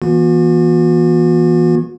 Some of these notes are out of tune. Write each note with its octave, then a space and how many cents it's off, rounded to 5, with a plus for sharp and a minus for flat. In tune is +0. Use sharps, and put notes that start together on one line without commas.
E3 +0 A#3 +45 F#4 -45